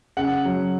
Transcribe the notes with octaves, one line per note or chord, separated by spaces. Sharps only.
C#3 F#5
F#3